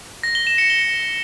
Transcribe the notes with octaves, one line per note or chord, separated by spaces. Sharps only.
A#6
G7
E7
C#7
G7